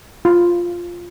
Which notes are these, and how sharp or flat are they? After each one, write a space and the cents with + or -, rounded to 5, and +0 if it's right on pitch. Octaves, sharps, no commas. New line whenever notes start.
F4 +0